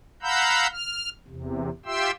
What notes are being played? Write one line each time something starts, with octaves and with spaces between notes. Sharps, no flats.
F5 F#5 A#5 B5 E6 G6
F6
E2 C3
F4 G4 E5 G5 C6 E6